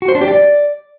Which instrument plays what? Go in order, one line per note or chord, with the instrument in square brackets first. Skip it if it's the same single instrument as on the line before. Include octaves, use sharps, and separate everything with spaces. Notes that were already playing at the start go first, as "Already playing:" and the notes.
[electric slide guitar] F#4
C5
D4
G4
D5